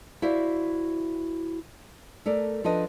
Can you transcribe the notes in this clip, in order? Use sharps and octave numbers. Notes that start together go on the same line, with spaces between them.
E4 F#4 C5 D5 E5 F5
A3 A4 A#4 D5
F3 D4 F4 A4 B4 D#5